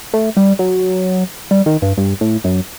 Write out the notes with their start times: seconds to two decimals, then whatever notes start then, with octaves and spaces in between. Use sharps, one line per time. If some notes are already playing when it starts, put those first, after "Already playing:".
0.14 A3
0.37 G3
0.59 F#3
1.51 G3
1.66 D#3
1.82 G2
1.98 G2
2.21 A2
2.44 F#2